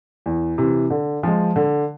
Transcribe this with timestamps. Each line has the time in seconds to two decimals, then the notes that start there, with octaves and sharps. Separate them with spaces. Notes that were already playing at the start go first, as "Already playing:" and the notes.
0.26 E2
0.58 C3 E3
0.90 D3
1.23 F3 G#3
1.56 D3